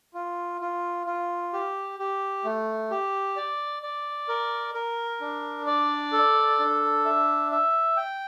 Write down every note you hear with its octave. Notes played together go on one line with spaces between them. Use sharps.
F4
F4
F4
G4
G4
A3
G4
D5
D5
A#4
A#4
D4
D5
A4
D4
E5
E5
G5